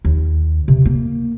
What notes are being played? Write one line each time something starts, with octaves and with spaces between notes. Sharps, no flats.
D#2
C3
A#3